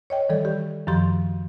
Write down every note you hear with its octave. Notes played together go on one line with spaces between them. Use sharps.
C#5 D#5 G5
D#3 E3 G3 A4 D5
G4
F#2 D#3 F3 G4 C6